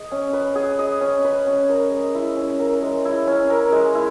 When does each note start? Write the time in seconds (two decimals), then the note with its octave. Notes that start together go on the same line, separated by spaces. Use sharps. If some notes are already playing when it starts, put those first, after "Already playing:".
Already playing: G#4 D#5
0.12 C#4
0.33 B4
0.56 G#4
0.79 D#5
1.01 C#4
1.24 B4
1.47 C#4
1.69 A#4
1.91 G#3
2.15 E4
2.37 C#4
2.60 A#4
2.82 G#3
3.05 E4
3.27 C#4
3.50 A#4
3.72 G#3
3.95 E4